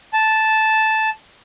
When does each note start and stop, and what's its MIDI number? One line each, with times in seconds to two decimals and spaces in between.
0.13 1.09 81